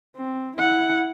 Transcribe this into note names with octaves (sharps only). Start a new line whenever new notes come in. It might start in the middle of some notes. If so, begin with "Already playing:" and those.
C4
E4 F#5